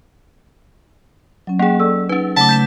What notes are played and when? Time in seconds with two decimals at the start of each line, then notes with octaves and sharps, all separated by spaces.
1.47 F#3 C#4
1.59 A#3 G#4 F#5 G5
1.79 A4 D5 E6
2.09 C#4 D#4 B4
2.36 C#3 A3 F#5 A5 D6
2.49 G6 B6 E7